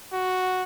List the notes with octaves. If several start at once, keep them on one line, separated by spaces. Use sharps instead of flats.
F#4